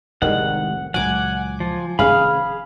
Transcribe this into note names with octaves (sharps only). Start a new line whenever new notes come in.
F1 C2 A2 D#3 G3 G#3 F#5
C#2 A#2 F#3 F#5 G#5 D6
F3
F1 D#3 C#4 G#4 F5 B5 F6